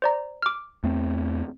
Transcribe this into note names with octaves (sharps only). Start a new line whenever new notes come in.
C5 D5 A#5
D6 F6
E2 A3 C4